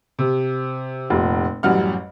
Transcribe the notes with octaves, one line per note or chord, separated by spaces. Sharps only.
C3
F1 A#2
A1 F#2 G3 F#5 F6